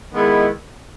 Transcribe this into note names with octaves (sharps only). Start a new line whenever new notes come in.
D#3 G#3 B3 E4